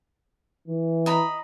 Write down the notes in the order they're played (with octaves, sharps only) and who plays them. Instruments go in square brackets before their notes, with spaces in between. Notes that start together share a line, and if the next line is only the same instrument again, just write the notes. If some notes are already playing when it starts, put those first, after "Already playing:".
[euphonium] E3
[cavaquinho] D#5 A#5 B5